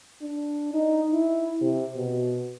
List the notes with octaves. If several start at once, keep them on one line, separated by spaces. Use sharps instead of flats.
D4
D#4
E4
C3
B2